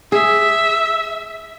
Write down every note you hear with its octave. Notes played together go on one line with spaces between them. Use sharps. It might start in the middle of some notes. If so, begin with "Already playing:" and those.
G#4 E5